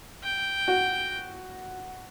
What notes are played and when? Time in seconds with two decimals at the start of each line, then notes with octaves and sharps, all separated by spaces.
0.23 G5
0.68 F#4